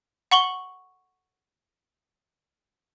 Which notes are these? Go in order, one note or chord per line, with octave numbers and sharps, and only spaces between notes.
F#5 C#6 F#7 G7